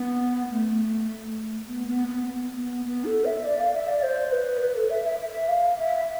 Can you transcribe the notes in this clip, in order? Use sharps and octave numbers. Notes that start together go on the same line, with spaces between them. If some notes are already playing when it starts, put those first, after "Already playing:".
Already playing: B3
A3
B3
B3
B3
B3
B3
B3
A4
E5
D5
F5
E5
D5
C5
B4
B4
A4
E5
E5
E5
F5
E5